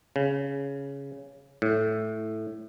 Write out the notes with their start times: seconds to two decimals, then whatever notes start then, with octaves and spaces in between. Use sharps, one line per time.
0.16 C#3
1.62 A2